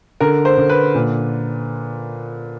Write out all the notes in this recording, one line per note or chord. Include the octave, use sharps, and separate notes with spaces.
D3 A#4
C5
D3
B4
A#2